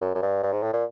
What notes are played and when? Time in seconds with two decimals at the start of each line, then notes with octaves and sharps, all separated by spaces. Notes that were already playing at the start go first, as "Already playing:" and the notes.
0.02 F#2
0.15 F#2
0.23 G2
0.43 G2
0.53 G#2
0.63 A2
0.73 A#2